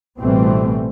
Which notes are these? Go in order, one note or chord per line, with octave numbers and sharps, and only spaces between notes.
A1 B2 E3 G3 A3 C4